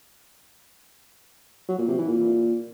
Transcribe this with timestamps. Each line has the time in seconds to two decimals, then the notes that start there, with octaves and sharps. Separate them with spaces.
1.69 F#3
1.79 A#2
1.88 C3
1.98 E3
2.08 A#2